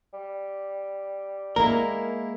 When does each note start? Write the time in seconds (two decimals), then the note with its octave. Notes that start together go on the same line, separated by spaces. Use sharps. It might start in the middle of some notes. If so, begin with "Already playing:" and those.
0.14 G3
1.56 G#3 A#3 E4 A#4